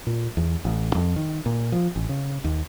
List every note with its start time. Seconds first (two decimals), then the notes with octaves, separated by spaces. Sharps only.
0.07 A#2
0.37 E2
0.65 A1
0.95 F2
1.16 D#3
1.46 A#2
1.72 F3
1.96 A1
2.09 C#3
2.44 D#2